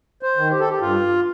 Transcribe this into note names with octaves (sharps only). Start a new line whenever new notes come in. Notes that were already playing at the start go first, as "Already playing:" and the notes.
C5
D#3
G4
A4
G4
G2 F4